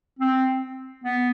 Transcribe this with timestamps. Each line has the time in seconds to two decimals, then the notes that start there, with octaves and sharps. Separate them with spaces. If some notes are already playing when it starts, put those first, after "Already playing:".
0.19 C4
1.04 B3